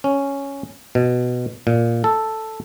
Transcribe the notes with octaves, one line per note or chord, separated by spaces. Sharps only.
C#4
B2
A#2
A4